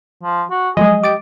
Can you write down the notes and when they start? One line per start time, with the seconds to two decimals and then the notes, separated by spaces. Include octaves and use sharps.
0.24 F3
0.51 F#4
0.77 F3 F#3 G#3 G#4 D#5
1.03 G4 D6 A6 D7